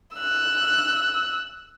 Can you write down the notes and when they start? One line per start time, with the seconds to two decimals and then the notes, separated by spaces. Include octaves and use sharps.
0.17 E6 F#6